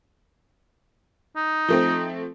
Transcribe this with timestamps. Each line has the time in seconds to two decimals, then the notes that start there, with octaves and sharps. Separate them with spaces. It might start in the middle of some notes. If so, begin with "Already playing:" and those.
1.36 D#4
1.68 F3 A3 C4